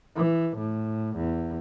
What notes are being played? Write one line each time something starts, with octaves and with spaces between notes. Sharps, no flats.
E3
A2
E2